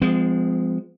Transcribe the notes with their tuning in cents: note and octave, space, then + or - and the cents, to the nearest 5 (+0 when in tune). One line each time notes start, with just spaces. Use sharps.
F3 +10 G#3 -5 C4 -35